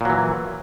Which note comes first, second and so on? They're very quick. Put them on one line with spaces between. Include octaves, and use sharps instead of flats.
A#2 F#3 E3